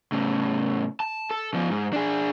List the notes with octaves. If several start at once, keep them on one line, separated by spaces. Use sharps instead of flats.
A2 C#3
A5
A4
F3 B3
G#2
D4 G#4